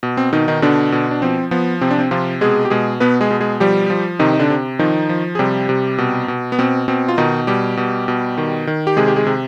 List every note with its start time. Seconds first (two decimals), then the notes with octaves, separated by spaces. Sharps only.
0.03 B2
0.17 C4
0.33 B2 D#3 D#4
0.48 D#3 D#4
0.62 B2 D3 D4
0.92 B2
1.11 D4
1.22 F3 C4
1.51 F3 B3
1.81 C3 C4
1.91 D4
1.98 C4
2.11 C3 F3 F4
2.41 B2 G#3 G#4
2.65 G4
2.70 B2 G#3 G#4
3.00 B2 B3 B4
3.21 G#3 G#4
3.31 B2
3.41 G#3 G#4
3.60 F3 G3 G4
3.90 F3
4.19 C3 D#3 D#4
4.33 D#4
4.39 D3 D4
4.50 C3
4.79 D#3 F3 D#4
5.09 F3
5.35 G#4
5.39 C3 G3 G4
5.69 C3
5.98 B2
6.28 B2
6.52 B3
6.59 B2 C4
6.88 B2 C4
7.08 F4
7.18 B2 D#3 D#4
7.47 B2 G3 G4
7.77 B2
8.08 B2
8.38 D#3
8.67 D#3
8.87 G4
8.97 C3 G#3 G#4
9.08 G4
9.16 G#3 G#4
9.26 C3